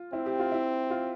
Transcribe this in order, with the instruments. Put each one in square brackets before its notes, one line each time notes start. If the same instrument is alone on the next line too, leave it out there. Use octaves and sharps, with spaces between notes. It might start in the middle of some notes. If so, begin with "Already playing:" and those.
Already playing: [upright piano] F4
[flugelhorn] C4 [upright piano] E4
[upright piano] G4
F4
E4
F4